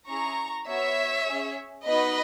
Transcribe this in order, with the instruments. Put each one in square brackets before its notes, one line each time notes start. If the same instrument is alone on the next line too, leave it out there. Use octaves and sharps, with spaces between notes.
[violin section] C#4 E4 G#4 A#5 C#6
B3 F#4 C#5 E5
C#4 G#4
B3 D#4 F#4 B4 D#5